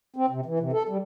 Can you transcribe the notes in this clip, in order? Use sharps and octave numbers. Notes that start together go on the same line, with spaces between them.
C4
C3
E3
C3
A4
G3